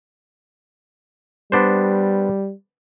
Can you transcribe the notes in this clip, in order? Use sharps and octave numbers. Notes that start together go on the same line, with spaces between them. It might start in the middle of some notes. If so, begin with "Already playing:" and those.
G3 B3 D4 C5